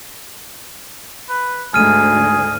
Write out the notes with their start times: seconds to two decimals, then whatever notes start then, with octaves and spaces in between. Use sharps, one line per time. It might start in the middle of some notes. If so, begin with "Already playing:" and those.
1.29 B4
1.74 D2 G#2 G#4 F6 D#7